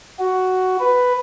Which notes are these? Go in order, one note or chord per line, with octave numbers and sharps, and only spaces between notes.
F#4
B4